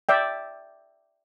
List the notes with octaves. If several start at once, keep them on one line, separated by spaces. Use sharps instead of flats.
D5 E5 G5